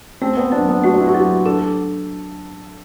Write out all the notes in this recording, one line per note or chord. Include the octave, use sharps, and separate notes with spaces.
A3 C4
B3
F#3 D4
B3
A3 F#4
D4
E4
F#4
F#3 G4
D4 A4